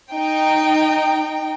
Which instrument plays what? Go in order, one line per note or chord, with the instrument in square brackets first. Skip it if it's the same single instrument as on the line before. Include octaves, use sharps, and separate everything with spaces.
[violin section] D#4 G5